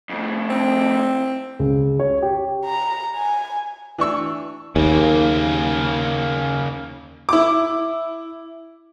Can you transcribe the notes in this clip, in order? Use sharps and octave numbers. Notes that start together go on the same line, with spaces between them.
F2 A2
C4
C#2
C#5
G4
A#5
G#5
E3 D4 C#6 E6
D#2 C#3 A#3
E4 D6